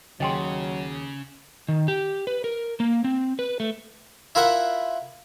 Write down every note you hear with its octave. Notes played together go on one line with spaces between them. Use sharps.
D#2 C#3 F#3 G#4 D#5 G5 C6
D#3
G4
B4
A#4
A#3
C4
B4
A3
E4 F4 A#4 E5 F#5